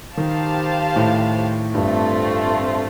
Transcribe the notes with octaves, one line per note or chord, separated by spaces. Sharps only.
D#3 G4 C5 F5 A5
A2
G2 A3 C4 F4